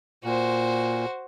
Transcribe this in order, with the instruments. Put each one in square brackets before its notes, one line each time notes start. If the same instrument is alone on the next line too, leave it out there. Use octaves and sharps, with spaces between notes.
[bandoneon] A#2 [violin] F#4 C5